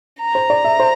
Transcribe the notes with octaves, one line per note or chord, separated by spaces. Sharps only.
A#5
C5
D5
E5
C5